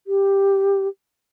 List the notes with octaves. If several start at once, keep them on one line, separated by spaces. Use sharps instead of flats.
G4